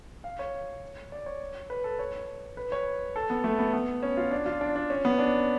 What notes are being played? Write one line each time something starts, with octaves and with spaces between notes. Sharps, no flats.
F5
C#5
D5
C#5
B4
A4
C#5
B4
C#5
A4
B3
A3
B3
B3
C#4
F4
D4
F4
D4
D4
C#4
B3
D4